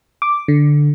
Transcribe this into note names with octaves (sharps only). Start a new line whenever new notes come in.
D6
D3